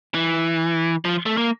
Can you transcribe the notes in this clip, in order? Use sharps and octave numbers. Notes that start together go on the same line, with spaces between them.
E3
F3
A3
A#3